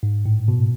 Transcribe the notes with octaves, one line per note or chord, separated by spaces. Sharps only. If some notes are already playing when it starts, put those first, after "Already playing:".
G#2
A2
B2